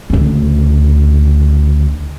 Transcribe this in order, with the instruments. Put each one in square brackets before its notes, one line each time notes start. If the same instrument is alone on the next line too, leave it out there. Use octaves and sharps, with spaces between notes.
[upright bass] D2 C#3